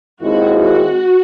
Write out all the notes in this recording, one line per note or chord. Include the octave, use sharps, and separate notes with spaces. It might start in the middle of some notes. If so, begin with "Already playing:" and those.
D#2 D#3 G#3 C4 E4 F#4
F#4